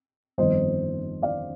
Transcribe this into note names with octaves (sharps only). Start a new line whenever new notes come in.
G1 F2 D#3 C5 D#5
D5 F5